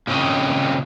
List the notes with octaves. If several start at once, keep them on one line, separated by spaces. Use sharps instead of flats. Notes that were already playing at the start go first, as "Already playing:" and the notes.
A#2 C#3 C4 C#4 D#5